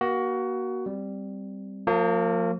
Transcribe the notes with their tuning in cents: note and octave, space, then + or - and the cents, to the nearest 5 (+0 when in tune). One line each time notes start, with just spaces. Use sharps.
A#3 +35 F#4 +20
G3 +0 C4 +0
F3 +30 A#3 -30